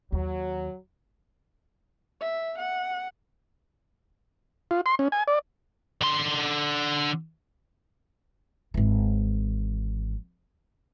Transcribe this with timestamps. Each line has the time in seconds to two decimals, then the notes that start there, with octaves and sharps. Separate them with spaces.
0.12 D#2 F#3
2.21 E5
2.58 F#5
4.71 F4
4.86 C6
4.99 C#4
5.12 G#5
5.28 D5
6.02 D3 C6
8.74 G#1 E3